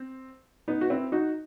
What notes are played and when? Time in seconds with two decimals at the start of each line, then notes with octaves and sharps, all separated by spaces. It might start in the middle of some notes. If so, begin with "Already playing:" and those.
Already playing: C4
0.68 B3 D#4
0.81 F#4
0.90 C4 E4
1.12 D#4 F#4